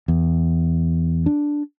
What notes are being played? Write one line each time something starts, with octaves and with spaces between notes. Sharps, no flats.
E2
D4